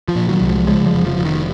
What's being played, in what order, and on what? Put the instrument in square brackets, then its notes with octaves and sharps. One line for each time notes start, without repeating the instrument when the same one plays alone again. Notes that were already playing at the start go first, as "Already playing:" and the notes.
[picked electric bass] F3
A#2
D#3 F#3
C2
F3 G#3
C#3 F3 G#3
F3 G#3
F1
F3
F1
D#3